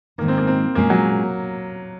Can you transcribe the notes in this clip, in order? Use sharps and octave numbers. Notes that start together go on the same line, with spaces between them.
G#2 D#3 G#3 A#3 D#4
C4
A#3
C4
A#2 G#3 A#3 C#4 G#4
F#3